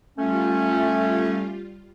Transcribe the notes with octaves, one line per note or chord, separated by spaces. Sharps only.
G3 A3 C#4 F4